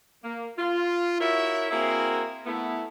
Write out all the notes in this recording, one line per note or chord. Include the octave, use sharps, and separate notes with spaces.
A#3
F4
E4 F#4 A#4 C#5 E5
A#3 C4 E4 F#4 G#4 A#4
A3 B3 E4